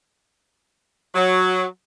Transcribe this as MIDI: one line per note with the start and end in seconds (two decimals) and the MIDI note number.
1.15 1.64 54